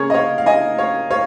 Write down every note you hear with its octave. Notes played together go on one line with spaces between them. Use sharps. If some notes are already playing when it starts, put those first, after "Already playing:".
Already playing: C#3 A#3 C#4 G#4 A#4 C#5
D#5
C#5 F5
F5
D#5 G#5
C#5 F5
C#5 F5